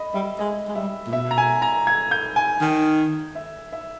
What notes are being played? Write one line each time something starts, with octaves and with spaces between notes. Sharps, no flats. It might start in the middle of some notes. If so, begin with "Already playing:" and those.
Already playing: D#5 B5
G3 E5
G#3 D#5
G#3
G3 E5
A#2
B2 E5
A#5
G#5
A#5
G#6
G6
G#5
D#3
E5
E5